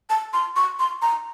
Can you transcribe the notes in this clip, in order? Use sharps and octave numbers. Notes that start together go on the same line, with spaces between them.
A5
C6
C#6
C6
A#5